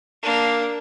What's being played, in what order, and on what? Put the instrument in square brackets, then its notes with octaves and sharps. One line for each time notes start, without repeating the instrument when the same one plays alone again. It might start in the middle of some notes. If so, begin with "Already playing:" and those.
[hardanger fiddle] A#3 D4